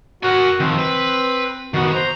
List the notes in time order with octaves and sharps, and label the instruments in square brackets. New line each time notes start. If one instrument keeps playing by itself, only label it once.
[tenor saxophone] F#4 [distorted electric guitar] A#4 G#5
[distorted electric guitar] D#3 F3 [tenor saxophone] C4
[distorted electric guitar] B4
[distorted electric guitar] D#3 B3 [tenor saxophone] F#4
[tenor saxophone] C5 [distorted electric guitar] A#5